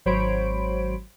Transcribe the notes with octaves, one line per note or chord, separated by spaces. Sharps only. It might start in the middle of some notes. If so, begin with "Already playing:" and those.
G#1 F#3 C5 C#5 B5 D7